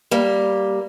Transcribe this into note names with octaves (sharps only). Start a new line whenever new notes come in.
G3 A#3